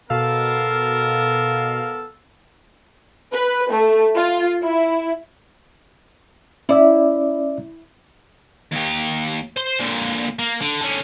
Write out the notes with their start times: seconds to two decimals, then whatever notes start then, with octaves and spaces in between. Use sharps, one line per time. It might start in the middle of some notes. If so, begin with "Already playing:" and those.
0.10 B2 B3 A4 A#4 F5
3.32 B4
3.71 A3
4.16 F4
4.63 E4
6.69 C#4 E4 D5 E5
8.72 D#2 G4
9.57 C5 C6
9.80 A#2 D3
10.39 A#3
10.61 D3
10.82 D3 C#4